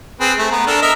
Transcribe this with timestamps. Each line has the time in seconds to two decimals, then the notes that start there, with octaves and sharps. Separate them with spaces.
0.20 C4 G#4 B4
0.38 A3
0.51 B3 A#5
0.67 D4 A4 A#4
0.82 A#4 D#5 E5